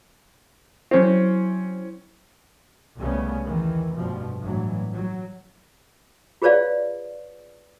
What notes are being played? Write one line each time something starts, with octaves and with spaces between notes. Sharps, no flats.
F#3 C4 C#4 E4
C2 C#3 G3 A3 B3 C#4
E2 D#3 E3
F1 G2 B2 F3
G1 A2 E3 F#3
F#3
F4 G#4 B4 C#5 D5 F5